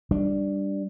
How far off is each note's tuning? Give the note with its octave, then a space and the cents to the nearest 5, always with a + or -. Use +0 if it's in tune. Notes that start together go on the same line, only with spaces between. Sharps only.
G3 +0 D4 +0